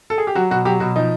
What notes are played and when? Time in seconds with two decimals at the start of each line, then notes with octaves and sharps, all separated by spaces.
0.10 A4
0.18 G#4
0.27 G4
0.35 F#3 F#4
0.50 B2 F#4
0.65 F#3 G4
0.80 B2 F#4
0.96 F3 D#4